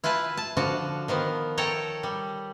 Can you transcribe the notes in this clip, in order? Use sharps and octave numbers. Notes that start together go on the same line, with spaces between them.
E4 F4 B4 G#5 A5
A5
D3 F3 F#4 A5
D#3 F3 B3
A4 C#5 G5 A5 A#5
G3